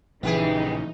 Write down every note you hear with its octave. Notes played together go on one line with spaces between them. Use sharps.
A#1 C#3 E3 B3 D#4 G4 G#4